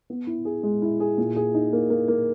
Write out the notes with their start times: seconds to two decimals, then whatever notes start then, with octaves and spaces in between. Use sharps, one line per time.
0.10 B3
0.27 E4
0.45 G#4
0.63 G#3
0.82 E4
1.00 G#4
1.18 A#2
1.36 G#4
1.54 D#4
1.73 A#3
1.90 A#3
2.08 A#3